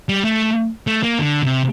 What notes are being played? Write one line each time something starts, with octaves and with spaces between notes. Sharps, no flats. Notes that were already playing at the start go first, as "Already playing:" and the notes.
G3
A3
A3
A#3
D3
C3